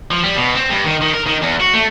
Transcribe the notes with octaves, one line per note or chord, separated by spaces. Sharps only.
F3
G3
B2
C4
G2
D#3
D#3
A#4
D#3
E2
F#4
A3